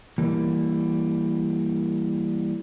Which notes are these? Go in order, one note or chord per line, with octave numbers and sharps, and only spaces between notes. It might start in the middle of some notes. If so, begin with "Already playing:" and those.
E3 G3 A#3